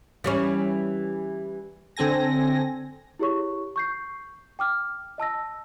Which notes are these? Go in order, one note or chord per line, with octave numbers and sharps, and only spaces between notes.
E3 G3 C#4
D3 C4 A4 G#5 A#6
E4 G4 G#4 C#5 C#6
C#6 G6 C7
G5 D6 F6
D#5 A5 E6 A#6